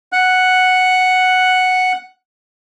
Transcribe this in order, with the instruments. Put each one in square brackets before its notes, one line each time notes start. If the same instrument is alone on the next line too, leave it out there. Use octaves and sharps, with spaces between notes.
[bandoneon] F#5 F#6